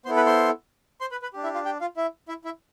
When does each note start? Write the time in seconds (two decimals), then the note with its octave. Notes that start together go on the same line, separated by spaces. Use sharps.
0.05 B3 E4 A4 C5 C6
0.16 B4 B5
0.26 C5 C6
1.01 C5 C6
1.11 B4 B5
1.22 B4 B5
1.33 D4 G4
1.43 E4 E5
1.54 F4 F5
1.65 G4 G5
1.81 F4 F5
1.97 E4 E5
2.28 E4 E5
2.45 E4 E5